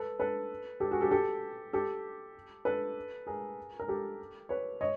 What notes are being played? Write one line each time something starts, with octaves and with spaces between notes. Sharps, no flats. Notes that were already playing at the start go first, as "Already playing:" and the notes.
Already playing: A4 B4
A4 B4
G4 A4
F#4 G#4
G4 A4
G4 A4
G4 A4
A4 B4
G#4 A#4
A#4
G4 A4
B4 C#5
C#5 D#5